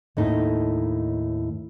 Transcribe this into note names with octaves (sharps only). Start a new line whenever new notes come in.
D#2 A2 D#4